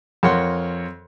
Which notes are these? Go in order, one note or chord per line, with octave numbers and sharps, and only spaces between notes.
F2 A#4 C#5 F#5 C6